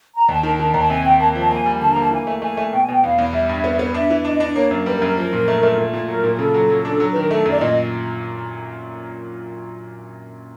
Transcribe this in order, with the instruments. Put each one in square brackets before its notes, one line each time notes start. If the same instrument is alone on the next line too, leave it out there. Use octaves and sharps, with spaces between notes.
[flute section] A#5
[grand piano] D#2 [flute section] A5
[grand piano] D#3
[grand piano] D#3 [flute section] A5
[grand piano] D#2 [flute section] A#5
[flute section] A5
[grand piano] C3 [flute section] G#5
[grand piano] C3 [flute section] G5
[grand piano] A#3 [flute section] A5
[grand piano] F3
[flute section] A5
[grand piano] A#3 [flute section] G#5
[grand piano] G3
[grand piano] D3 [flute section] A5
[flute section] A#5
[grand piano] A#3
[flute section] A5
[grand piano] E3 [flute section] G#5
[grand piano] A3
[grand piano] A3 [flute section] G#5
[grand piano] A3
[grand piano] B2 [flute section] G5
[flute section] G#5
[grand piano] B2 [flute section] G5
[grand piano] E2 [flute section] F5
[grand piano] E2
[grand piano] G3 [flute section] E5
[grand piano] G2
B3
B3
[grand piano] D4 [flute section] E5
[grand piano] E3
[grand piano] D4 [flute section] D#5
[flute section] D#5
[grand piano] D4
[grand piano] A#3 [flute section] C#5
[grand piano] F#2
[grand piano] G3 [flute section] B4
[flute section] A#4
[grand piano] F#2
[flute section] A#4
[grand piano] F3 [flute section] A#4
[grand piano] A#2
A3
A3
A#2
A#2
[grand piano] F#3 [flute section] A#4
[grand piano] A#2
[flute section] G#4
[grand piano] C#3 [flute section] A4
[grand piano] F#3
F#3
D4
F#3
[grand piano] D#3 [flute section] B4
[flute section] A#4
[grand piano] A3 [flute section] A4
[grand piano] F#2
[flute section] D5
[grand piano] A#2 [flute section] D#5